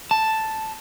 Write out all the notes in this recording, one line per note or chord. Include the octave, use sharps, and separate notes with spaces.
A5